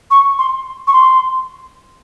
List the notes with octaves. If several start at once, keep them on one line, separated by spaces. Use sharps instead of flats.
C#6
C6
C#6
C6